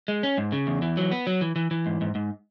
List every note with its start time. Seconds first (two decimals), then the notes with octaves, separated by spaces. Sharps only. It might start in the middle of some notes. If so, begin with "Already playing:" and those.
0.08 G#3
0.23 C#4
0.38 G#2
0.52 C#3
0.67 E2
0.82 E3
0.97 F#3
1.12 B3
1.27 F#3
1.41 E3
1.56 E3
1.71 E3
1.86 G#2
2.01 G#2
2.15 G#2